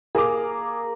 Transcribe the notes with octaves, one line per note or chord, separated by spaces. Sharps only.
A#3 G#4 A#5 D6